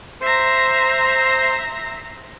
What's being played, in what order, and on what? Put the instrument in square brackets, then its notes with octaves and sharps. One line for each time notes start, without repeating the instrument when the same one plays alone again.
[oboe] C5 [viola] E5 A#5